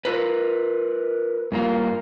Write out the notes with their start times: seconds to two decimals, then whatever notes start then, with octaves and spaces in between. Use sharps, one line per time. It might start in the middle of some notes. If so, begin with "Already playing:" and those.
0.05 F4 A#4 B4
1.52 G2 A#3 F4